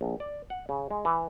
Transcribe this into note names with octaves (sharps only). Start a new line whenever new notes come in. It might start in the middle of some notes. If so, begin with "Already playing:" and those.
A#1
D5
F#5
C#3
G#3
E3